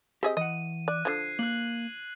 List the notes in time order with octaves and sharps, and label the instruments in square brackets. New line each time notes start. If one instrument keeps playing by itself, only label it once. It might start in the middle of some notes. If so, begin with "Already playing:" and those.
[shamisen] C4 G#4 D#5 [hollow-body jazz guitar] G4
[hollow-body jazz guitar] E3 F#5 [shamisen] D#5 [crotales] D#7
[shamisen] D5 [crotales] F#6
[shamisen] D3 F3 [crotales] G#6 C7
[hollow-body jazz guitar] A#3 [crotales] F#6 F#7